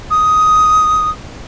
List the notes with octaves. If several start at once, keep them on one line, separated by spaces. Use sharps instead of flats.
D#6